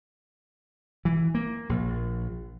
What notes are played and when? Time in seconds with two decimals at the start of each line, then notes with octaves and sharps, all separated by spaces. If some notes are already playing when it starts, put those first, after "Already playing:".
1.05 E3
1.35 A#3
1.69 A#1